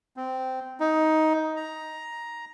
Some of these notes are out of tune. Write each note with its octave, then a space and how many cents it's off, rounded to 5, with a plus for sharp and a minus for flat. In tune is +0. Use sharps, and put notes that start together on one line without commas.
C4 -15
D#4 +15
A#5 +10